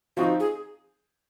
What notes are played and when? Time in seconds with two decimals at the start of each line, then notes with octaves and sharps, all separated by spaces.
0.17 F3 C4 D#4 F#4
0.40 G#4